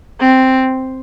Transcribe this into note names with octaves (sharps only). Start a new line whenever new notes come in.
C4